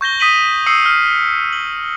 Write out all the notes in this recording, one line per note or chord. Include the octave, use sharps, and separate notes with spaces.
C#6 G6 A#6 G7
D#6 B6 D#7 F#7
D#6 E6 C7 C#7 F#7
F6
F#7